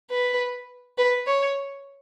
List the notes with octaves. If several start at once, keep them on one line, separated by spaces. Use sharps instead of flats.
B4
B4
C#5